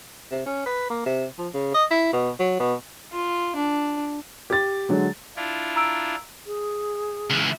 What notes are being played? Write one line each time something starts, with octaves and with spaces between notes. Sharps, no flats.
C3
C#4
B4
A#3
C3
F3
C#3
D#5
E4
B2
F#3
B2
F4
D4
G4 A6
D3 F#3 G#3
D4 E4 F4
A#5 E6 D7
G#4
C#2 E3